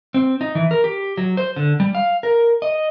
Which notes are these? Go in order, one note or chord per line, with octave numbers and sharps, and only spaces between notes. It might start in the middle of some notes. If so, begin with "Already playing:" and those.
C4
D#4
E3
A#4
G4
F#3
C5
D3
G3
F5
A#4
D#5